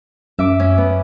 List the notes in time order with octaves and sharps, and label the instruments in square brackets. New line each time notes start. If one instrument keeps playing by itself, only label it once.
[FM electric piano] F#2 [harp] E5 D6
[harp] C#4
B3